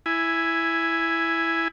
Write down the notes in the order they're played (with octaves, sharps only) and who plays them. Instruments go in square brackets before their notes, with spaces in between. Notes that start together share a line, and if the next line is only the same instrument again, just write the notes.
[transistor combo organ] E4 G#5